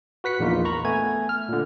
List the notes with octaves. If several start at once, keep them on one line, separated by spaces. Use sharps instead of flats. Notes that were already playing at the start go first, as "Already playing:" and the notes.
F#4 B4 B6 C#7
A#1 E2 A#3 D#4 F4
A#5 B5 C#6
A3 B3 G#5 G#6
F6
A#2 D3